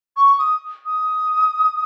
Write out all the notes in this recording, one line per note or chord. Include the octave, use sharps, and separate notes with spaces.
C#6
D#6
D#6